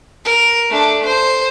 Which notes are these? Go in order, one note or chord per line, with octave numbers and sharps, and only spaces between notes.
A#4
A3 D4
C5